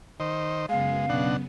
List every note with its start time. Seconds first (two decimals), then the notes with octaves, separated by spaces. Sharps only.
0.20 D#3 C5 D#5
0.69 F#2 C#3 G#3 B3 F5
1.09 B2 D4 F#5